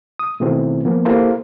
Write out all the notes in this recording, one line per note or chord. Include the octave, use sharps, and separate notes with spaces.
D#6
B2 D#3 A3 B3 C4 E4
F3 A#3 B3
A#3 E4 G4 A4 A#4 C5